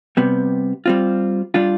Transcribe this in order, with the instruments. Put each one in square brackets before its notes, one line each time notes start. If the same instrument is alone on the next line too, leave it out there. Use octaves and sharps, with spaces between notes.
[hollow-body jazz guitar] C3 G3 B3
G3 C4 F4
G3 D4 F4